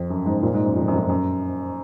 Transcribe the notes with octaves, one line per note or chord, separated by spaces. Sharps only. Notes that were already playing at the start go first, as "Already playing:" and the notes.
Already playing: F2
F#2
G#2
A#2
G#2
F#2
F2
F#2
F2
F#2
F#2